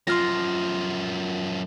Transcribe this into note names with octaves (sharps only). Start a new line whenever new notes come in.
F#2 F3 F4 C6 F6 A#6